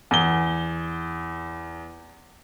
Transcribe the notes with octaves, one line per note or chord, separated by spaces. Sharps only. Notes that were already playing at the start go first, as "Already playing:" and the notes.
E2 G7